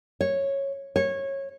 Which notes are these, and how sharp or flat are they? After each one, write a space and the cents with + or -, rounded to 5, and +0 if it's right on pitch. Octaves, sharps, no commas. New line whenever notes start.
C#5 -10
C#5 -20